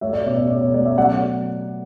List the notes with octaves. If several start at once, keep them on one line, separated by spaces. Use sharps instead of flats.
A3 C#5 E5
D5
B2 C#5 E5
D5
B2 D5
C#5
A3 D5
C#5 E5
F#3 D5 F#5